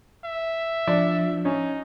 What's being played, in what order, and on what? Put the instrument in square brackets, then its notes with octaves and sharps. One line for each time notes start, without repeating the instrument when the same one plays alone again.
[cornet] E5
[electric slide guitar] F3 D4 [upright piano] D5
[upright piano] C#4 [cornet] D#4